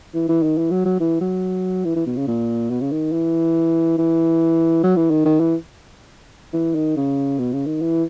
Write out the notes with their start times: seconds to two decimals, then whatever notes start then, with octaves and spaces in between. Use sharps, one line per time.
0.14 E3
0.29 E3
0.43 D#3
0.58 E3
0.71 F#3
0.85 F#3
1.00 E3
1.21 F#3
1.85 E3
1.96 E3
2.06 B2
2.16 C#3
2.27 A#2
2.71 B2
2.81 C#3
2.92 D#3
3.12 E3
3.98 E3
4.83 F#3
4.97 E3
5.11 D#3
5.25 D#3
5.40 E3
6.53 E3
6.75 D#3
6.96 C#3
7.39 B2
7.53 C#3
7.67 D#3
7.81 E3